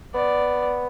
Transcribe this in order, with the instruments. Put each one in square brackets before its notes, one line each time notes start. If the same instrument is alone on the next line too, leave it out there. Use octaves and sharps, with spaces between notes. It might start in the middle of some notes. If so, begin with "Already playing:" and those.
[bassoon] B3 [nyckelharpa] D5